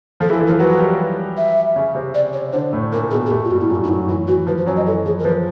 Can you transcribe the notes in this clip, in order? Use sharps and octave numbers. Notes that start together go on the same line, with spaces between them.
F3 F4 A4
E3 E4 G#4
A4
E3 E4
F3 F4 A#4
F#3 F#4 B4
G3 G4
E5
C#3 C#4
C3 C4
D5
C#5
D3 D4 C5
A2 A3
A#2 A#3 A#4
B2 B3 G#4
G#4
A2 A3 G4
F4
G2 G3 F#4
E4
F#2 F#3 F4
D#4
F#2 F#3 E4
E3 E4
E3 F#4
F3 B4
C5
F#2 F#3 C#5
D#5
E3 A4
F3 G#4
A#4
F3 B4